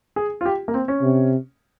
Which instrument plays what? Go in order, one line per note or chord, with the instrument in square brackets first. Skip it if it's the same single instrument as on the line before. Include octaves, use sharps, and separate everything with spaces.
[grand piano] G#4
F4
G4
A#3
C4
C#4
[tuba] C3